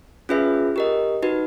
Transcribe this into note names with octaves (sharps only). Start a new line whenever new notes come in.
C#4 F4 G#4 B4 E5
G4 A#4 D#5
D#4 F#4 B4